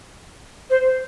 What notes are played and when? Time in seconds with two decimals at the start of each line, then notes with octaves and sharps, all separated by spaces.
0.69 C5